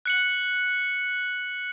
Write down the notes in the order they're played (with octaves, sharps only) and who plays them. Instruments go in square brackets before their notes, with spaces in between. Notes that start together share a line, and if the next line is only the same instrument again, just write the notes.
[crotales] F#6 C#7 F#7